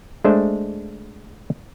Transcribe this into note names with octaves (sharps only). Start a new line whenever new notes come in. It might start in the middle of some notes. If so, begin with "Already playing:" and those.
G#3 A3 D4 C5